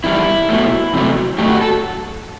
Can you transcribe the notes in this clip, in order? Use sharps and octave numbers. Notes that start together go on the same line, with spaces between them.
E2 D#3 G3 E4
B2 F#3 A3
E2 C3 F#3 A3
A2 F#3 A3 G4
F#4
A4